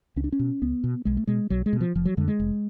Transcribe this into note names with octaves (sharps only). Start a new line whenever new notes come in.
C#2 C#4
D4
C#4
B2
C#2 B3
B2
B1 G#3
A3
B2 G#3
B1 F#3
G#3
B2
F3
F1 F3
F#3
F2 D3 G#3
G#3
F1